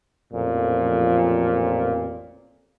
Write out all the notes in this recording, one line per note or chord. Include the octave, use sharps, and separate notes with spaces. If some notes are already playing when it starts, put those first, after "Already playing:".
A1 F2 A#2 F3